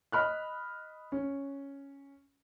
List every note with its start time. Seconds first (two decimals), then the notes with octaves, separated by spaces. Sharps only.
0.12 D#5 B5 F6 F#6
1.12 C#4